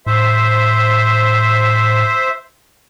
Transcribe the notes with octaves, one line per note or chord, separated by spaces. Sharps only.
A2 C5 E5